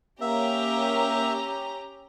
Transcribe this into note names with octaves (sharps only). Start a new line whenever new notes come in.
A#3 C#4 G4 E5 A#5